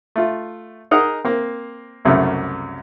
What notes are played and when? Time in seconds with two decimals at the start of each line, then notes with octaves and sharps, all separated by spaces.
0.16 A3 F4
0.91 D#4 G#4 A#4 D#5 F#5 A#5
1.25 A#3 C4
2.05 C2 F#2 C#3 A3